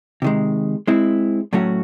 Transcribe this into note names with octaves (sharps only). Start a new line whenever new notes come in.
C3 D#3 G#3
G#3 C4 E4
A2 F#3 A3 C#4 F#4